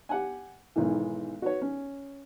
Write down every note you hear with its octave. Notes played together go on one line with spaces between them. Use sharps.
G4 F#5 G#5
B1 G#2 D#3 E3
F#4 B4 C#5
C#4